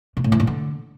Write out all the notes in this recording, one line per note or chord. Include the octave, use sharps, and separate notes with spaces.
A#2
A2
E3
A#2
D3